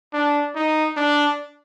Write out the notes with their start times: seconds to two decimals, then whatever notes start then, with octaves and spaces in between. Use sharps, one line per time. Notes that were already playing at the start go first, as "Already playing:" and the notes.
0.13 D4
0.55 D#4
0.97 D4